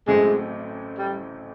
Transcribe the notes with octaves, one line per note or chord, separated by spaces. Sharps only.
A1 A2 F#3 G#3 A3 C4
G3